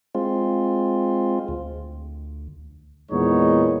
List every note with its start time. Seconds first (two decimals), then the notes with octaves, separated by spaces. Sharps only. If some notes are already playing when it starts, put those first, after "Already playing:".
0.15 G#3 C4 F4
1.48 D2
3.11 E2 A#2 G#3 B3 D#4 C#5